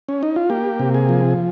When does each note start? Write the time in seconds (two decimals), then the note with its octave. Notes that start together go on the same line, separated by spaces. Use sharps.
0.09 C#4
0.23 D#4
0.36 F4
0.50 A#3 G4
0.79 C3
0.94 G#4
1.09 F3